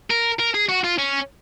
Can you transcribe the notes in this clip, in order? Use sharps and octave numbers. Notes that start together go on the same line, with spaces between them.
A#4
A#4
G#4
F#4
F4
C#4